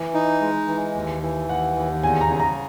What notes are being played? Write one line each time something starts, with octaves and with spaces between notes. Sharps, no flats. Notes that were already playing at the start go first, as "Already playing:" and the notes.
Already playing: E3
D#4
G#3
E3
D#2
E3
D#2 F#5
D#2
E2 G#5
A#5
C#3
A#5